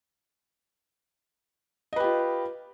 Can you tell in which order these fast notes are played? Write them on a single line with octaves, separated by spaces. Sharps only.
D#5 B4 G4 F4